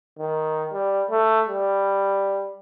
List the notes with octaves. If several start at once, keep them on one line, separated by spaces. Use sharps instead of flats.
D#3
G3
A3
G3